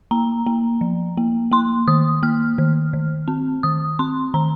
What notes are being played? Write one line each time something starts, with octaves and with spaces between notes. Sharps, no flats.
A#3 A#5
A#3
F3
A#3
A#3 C6
D#3 D#6
A#3 F6
D#3
D#3
C4
D#3 D#6
C4 C6
D#3 A#5